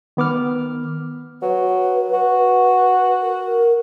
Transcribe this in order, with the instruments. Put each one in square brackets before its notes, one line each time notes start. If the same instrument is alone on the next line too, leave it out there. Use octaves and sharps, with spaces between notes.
[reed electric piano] D#3 B3 D6 F6
[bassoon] F#3 [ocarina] B4
[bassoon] F#4
[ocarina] A#4